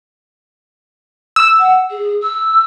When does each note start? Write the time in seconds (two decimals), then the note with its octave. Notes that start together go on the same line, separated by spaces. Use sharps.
1.36 E6
1.59 F#5
1.90 G#4
2.22 E6